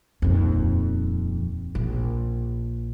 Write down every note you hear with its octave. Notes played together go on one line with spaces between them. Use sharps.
D#1 F2
A#1